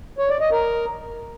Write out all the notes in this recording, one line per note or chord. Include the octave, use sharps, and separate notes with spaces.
C#5
D5
D#5
A#4